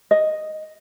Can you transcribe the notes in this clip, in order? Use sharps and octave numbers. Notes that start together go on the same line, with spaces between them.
D#5